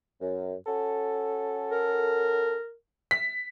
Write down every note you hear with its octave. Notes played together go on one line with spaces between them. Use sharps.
F#2
C#4 F#4 A4
A#4
B6